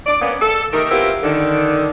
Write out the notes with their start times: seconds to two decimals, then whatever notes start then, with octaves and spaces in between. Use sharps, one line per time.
0.07 D5
0.22 A#3 B3 C#4
0.42 A4
0.73 D#3 A3 D#4 G4 A#4
0.91 B3 C4 E4 F4 G4 A#4
1.24 D3 D#3